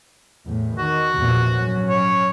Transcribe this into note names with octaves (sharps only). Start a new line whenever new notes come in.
E2 A2
D#3 F#4
A#1 E2 C3
G#2 F#3 C#4
C#5